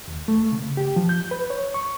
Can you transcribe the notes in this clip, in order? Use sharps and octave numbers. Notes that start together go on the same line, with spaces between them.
D#2
A3
C#3
G4
F3
G6
B4
C#5
C#6